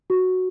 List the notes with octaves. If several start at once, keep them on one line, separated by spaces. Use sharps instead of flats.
F#4